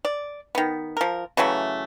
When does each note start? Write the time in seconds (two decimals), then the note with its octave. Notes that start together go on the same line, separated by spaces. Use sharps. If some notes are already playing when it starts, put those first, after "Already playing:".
0.05 D5
0.55 D#3 B3
0.97 F3 A#4
1.37 C#3 E3 F#3 A3